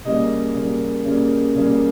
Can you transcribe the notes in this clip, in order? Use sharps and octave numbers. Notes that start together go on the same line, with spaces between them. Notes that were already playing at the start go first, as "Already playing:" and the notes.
C#3 G3 A#3 D#5
C#3 G3 A#3
C#3 G3 A#3
C#3 G3 A#3